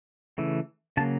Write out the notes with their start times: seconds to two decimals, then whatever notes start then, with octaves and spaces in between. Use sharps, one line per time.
0.38 C#3 E3 A3
0.97 C#3 F#3 A#3 A5